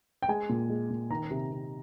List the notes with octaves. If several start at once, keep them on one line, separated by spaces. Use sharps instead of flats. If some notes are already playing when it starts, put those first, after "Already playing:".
G5
G#3 G#5
A#2
G#3
A#2
D#3 A#5
C3
C3